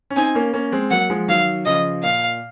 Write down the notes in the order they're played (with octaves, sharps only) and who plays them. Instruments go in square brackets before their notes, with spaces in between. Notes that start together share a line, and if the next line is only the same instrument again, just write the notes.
[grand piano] C#4
[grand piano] C4 D#4 [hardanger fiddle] G#5
[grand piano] A#3 C#4
A#3 C#4
G#3 C4
[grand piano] F#3 A#3 [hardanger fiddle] F#5
[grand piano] F3 G#3
[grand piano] D#3 F#3 [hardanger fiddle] F5
[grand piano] C#3 F3 [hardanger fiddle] D#5
[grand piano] A#2 [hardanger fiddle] F5